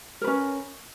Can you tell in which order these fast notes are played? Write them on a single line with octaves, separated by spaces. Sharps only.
A#4 B4 C#4